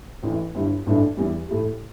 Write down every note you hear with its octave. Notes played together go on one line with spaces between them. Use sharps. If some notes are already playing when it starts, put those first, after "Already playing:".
A1 A2 E3
G1 G2 G3 E4
A1 G2 E3 A3 D4
E2 E3 G3
A2 A3 E4 G4